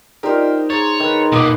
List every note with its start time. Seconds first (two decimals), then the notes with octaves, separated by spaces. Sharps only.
0.23 D#4 F4 G4 A#4 C5 D5 D#5
0.70 G#4 C#5 A#5 C6 A6
1.00 D#3 B4
1.32 D#1 B2 D6 D#6